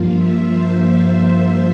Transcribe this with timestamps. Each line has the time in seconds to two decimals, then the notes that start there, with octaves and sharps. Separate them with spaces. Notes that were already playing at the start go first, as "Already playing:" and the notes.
Already playing: G2 F3 A#3 F4
0.12 E5
0.46 C5
0.79 E5